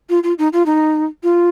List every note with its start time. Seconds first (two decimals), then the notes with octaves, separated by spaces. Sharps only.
0.10 F4
0.23 F4
0.39 D#4
0.53 F4
0.66 D#4
1.23 F4